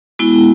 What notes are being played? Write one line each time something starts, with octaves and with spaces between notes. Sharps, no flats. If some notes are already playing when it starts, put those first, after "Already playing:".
G#3 B3 E4 F#4